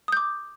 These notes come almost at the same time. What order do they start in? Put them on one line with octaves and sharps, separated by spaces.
D#6 G6 D6